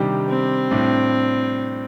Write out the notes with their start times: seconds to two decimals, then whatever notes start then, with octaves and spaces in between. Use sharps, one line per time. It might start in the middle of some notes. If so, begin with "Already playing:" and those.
Already playing: C3 D#3 G3 D4 G4
0.29 C4
0.71 A2 G3 D4